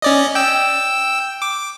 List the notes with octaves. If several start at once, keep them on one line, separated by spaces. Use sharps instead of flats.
C#4 D5 D#5
G5 E6
D6